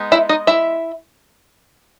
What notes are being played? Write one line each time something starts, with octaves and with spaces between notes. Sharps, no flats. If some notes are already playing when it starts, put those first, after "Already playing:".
Already playing: G#3 B3 D#4
E4 E5
D#4 D#5
E4 E5